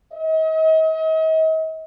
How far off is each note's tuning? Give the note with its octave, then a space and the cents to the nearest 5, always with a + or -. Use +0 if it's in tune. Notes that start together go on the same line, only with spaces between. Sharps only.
D#5 +40